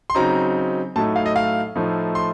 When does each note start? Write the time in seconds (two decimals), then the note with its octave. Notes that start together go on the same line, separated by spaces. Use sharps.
0.10 C6
0.15 C#3 F#3 C4 D#4 A#5
0.96 A2 F#3 A3 D#4 A5
1.16 F5
1.26 D#5
1.36 F5
1.76 A2 F3 A3 D#4
2.15 C6